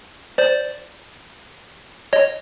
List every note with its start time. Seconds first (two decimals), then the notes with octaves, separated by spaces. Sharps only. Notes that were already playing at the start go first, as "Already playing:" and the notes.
0.38 C5 D5
2.13 C#5 D#5